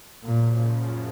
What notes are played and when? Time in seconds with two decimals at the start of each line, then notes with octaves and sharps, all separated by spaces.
0.24 F#2 A#2 C#3 F3